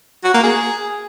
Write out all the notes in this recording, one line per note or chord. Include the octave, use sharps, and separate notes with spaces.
F#4
A#3
G#4